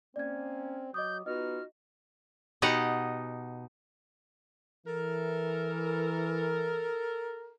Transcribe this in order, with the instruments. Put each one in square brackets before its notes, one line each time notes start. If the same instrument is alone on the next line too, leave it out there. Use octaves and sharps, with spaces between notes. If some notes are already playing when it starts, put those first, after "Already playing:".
[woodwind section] A#3 C#4 [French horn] C4 [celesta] D5 G#6
[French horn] F#3 [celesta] D#5 D6 D#6 [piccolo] G6
[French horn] B3 [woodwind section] D#4 F4 F#4 [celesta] D#5 [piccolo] F6
[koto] B2 D#4 G4 D#5 F#5 A#5
[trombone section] E3 [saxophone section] A4 A#4